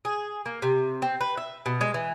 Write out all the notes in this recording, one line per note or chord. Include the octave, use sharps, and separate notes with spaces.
G#4
A#3
C3
C4
B4
E5
B2
G#3
E3